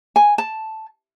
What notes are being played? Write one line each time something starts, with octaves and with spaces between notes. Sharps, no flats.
G#5
A5